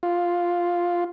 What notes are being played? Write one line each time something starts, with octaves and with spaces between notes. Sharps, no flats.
F4